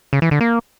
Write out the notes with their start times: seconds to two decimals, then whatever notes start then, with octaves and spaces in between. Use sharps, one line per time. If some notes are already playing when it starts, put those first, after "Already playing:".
0.13 C#3
0.22 E3
0.31 D3
0.41 A#3